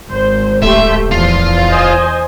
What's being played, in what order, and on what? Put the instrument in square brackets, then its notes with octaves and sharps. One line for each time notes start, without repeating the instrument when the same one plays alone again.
[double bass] G#1 [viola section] C5
[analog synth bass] D1 [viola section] A3 G4 C6 [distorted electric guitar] E5
[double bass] E2 [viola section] F3 [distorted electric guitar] F4
[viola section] C5 D#5 G#5